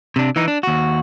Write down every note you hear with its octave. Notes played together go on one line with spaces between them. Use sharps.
C3 D4
E3 D#4
D4
D#2 F#4